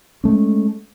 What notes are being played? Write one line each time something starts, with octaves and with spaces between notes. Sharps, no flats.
G#3 A3 C#4